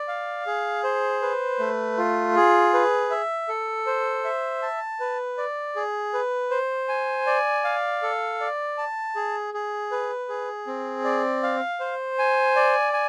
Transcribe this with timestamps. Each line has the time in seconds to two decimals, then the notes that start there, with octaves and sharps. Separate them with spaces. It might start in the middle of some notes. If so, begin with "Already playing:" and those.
Already playing: D5
0.08 F5
0.46 G#4
0.84 C5
1.22 B4
1.59 A3
1.98 F4
2.36 G#4
2.74 B4
3.10 E5
3.49 A4
3.86 C5
4.24 E5
4.62 A5
5.00 B4
5.38 D5
5.76 G#4
6.13 B4
6.51 C5
6.88 G#5
7.27 D5
7.64 F5
8.02 A4
8.40 D5
8.78 A5
9.16 G#4
9.54 G#4
9.91 B4
10.29 G#4
10.67 C4
11.04 D5
11.43 F5
11.80 C5
12.19 G#5
12.56 D5
12.93 G#5